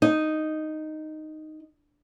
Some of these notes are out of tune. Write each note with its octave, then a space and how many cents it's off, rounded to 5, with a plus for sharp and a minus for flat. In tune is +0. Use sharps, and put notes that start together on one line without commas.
D#4 -5